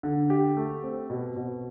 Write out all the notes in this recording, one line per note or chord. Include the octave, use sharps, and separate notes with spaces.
D3
G4
A3
C4
B2
B2